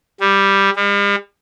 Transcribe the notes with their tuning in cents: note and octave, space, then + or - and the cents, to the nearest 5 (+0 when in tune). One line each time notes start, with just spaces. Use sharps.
G3 +5
G3 +45